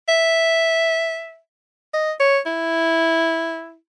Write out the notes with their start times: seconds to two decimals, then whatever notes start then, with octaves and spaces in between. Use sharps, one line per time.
0.09 E5
1.94 D#5
2.20 C#5
2.46 E4